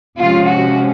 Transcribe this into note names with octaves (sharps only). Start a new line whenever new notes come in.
C3 F3 G#3 C#4 F4
F#4